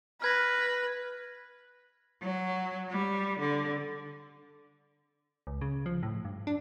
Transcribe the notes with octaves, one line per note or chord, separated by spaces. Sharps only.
B4 F6 G#6 A#6
F#3
G3
D3
C#2
C#3
F3
A2
G2
D4